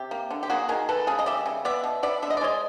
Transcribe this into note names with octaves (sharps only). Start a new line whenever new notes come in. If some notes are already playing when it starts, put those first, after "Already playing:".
Already playing: C3 G4
A#3
D3
G4
A#3 F#4 G#4
D#3 G#4 A#4
A3 A4 B4
C#3 G#4 A#4
D#5
G3 D5 E5
C#3
B3 D5 E5
B2
B3 D5 E5
D3 E5
D#5
D5
G#3 C#5 D#5